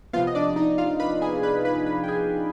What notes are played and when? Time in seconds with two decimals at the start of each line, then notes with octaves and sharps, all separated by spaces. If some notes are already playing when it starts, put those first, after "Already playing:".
0.13 C3 F3 B3 F4 F5
0.27 D#5
0.35 D4 D5
0.56 D#4 D#5
0.78 F4 F5
1.00 B4 B5
1.22 G#4 G#5
1.43 B4 B5
1.65 B4 B5
1.86 B4 B5
2.04 G5
2.08 G#4 G#5